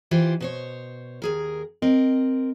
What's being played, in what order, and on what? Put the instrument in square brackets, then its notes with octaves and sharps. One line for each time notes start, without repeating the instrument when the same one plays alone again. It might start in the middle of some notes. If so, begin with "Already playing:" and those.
[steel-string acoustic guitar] E3 F4 G4 C5
B2 C5 C#5
D#2 G#4 A#4
C4 A#4 D#5